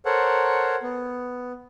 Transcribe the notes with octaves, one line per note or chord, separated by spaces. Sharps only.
A4 A#4 C5 C#5 F#5
B3